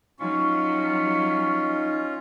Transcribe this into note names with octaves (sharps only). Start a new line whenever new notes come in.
F#3 C#4 D#4 F4 C#6